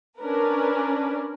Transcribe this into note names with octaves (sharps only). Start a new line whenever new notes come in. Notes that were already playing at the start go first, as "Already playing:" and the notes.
C#4 D4 A#4 B4